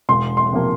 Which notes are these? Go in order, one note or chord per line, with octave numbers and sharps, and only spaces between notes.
E1 C6
C6
C3 F3 A#3